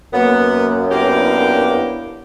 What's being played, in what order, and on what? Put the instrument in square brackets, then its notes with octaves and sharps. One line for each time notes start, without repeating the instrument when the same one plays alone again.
[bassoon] F#2 [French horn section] A#3 [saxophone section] B3
[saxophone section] A#3 G4 [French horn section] B3 D4 E4